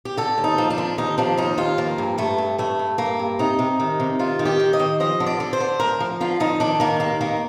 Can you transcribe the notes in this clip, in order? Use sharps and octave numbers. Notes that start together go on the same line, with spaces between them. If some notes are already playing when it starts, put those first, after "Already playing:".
G4
D3 A4
D#2
D#4
F3
D4
D3
D#2 D#4
F3 D4
D#2 D#4
D#2 F4
F3 A#3
G2
G2 A3
G2
G2 A3
G2
G2 A#3
G2
C3 D#4
C3
D#3
C3
D#3 F4
D#3
G4
D#3
D#5
D#3
F3 D#5
D3
D5
D3
C5
D3
D2 A#4
F3
D3 F4
F3 D#4
D#3 D4
D#3 A#3
D#2 A#3
D#3 A#3